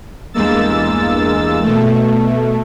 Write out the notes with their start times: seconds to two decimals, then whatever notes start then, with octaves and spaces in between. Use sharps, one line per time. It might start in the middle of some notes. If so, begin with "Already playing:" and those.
0.34 E2 G2 G#3 A#3 E6 A6
1.62 B2 A3